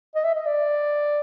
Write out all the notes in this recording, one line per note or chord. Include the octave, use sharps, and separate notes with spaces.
D#5
E5
D#5
D5